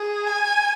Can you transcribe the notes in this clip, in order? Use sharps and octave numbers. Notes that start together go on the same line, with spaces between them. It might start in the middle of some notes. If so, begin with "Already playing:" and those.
Already playing: G#4
G#5